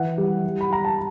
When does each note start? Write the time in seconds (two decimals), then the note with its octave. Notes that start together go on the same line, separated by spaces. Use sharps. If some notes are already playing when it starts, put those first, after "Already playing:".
Already playing: E3 F#5
0.18 G3
0.44 G3
0.61 B5
0.71 G3 A#5
0.85 A5